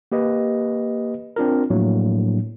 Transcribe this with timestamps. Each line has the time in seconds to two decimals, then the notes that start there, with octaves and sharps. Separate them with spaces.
0.12 A#3 G4 B4 D#5
1.36 C4 D4 F4 A#4
1.70 A2 F3 F#3 A#3 D4